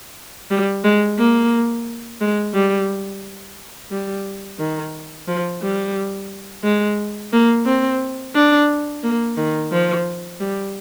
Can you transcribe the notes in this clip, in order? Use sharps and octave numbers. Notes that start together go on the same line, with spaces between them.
G3
G#3
A#3
G#3
G3
G3
D#3
F3
G3
G#3
A#3
C4
D4
A#3
D#3
F3
G3